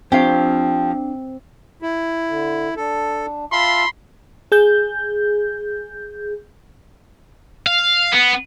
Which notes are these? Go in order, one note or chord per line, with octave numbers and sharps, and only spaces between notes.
F3 C4 D4 G4 F5
E4
D3
D4 A4
F4 E5 F5 A5 B5 C6
G#4 G6
F5
B3